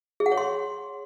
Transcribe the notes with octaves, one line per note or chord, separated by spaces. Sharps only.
G#4
F#5
C#5
C6